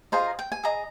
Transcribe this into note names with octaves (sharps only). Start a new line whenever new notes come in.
F4 G#4 C5 D#5 A#5
G5
G#5
G#4 D#5 A#5